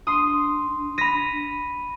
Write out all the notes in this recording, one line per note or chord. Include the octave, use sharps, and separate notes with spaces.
D4 C6 D#6
B5 A#6 B6 D#7